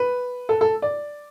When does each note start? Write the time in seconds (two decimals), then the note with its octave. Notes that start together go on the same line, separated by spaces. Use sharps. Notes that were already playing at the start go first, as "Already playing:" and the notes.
Already playing: B4
0.49 A4
0.61 A4
0.82 D5